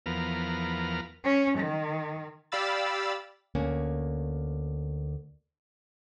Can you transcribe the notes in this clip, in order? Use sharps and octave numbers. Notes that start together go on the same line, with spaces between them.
E2 F3 B3 A#4 F6
C#4
D#3
G4 D5 F5 B5 E6 A6
D2 A#3 C#4